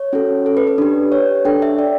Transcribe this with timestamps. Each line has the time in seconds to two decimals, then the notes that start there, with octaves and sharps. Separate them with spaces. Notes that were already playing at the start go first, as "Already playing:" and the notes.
Already playing: C#5
0.13 C#4 F#4 A4
0.46 A4
0.57 B4
0.67 B4
0.78 D4 G4
1.12 C#5
1.45 D4 A4 G5
1.62 E5
1.79 D5